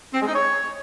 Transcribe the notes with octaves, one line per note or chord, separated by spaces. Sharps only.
C4
G#3
D#4
C#5